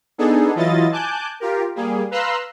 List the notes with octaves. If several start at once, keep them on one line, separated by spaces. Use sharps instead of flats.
B3 D4 D#4 G#4 A4
E3 F#3 E4 F4 D#5 A6
G#5 A5 D6 F#6 G6
F4 G4 A#4
G3 A#3 G#4
B4 F5 A#5 C6 E6 F#6